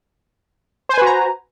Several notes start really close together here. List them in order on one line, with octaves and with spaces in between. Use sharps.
C5 G#5 B4 F#4 A#5